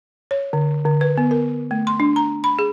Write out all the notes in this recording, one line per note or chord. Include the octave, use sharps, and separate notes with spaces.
C#5
D3
D3
B4
B3
A#4
A3
C6
D4
A#5
B5
G#4